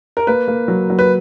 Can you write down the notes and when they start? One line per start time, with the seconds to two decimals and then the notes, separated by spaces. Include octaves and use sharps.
0.17 A#4
0.27 A#3 B4
0.48 A#3
0.68 F#3
0.90 F#3
0.99 B4